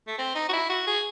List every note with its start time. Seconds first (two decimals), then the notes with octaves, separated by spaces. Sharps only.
0.07 A3
0.18 C4
0.35 D#4
0.49 F#4
0.53 E4
0.69 F#4
0.87 G#4